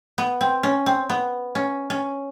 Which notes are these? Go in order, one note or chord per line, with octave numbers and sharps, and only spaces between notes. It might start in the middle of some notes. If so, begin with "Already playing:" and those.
B3
C4
C#4
C4
B3
C#4
C#4